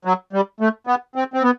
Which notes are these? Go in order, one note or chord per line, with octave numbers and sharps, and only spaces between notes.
F#3
G3
A3
B3
C4
C4
B3